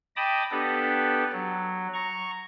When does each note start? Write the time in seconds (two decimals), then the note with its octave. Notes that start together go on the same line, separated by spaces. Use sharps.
0.16 D#5 G5 A5 B5 D6 D#6
0.51 B3 D4 G4 A4 B4
1.32 F#3
1.94 A#5 C#6